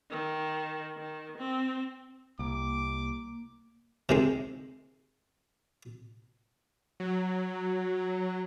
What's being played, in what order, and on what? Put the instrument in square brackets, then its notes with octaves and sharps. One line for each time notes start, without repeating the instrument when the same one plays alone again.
[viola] D#3
D#3
C4
[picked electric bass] C2 [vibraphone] A#3 [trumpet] D6
[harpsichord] C3 D#3 G#3
[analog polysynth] F#3